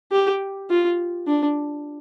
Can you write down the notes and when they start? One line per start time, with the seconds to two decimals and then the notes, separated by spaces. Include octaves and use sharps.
0.12 G4
0.70 F4
1.27 D4